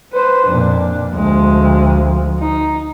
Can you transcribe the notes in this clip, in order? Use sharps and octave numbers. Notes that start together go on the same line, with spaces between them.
B4 C5
F2 A#2 D4
D2 F3 G#3
D#4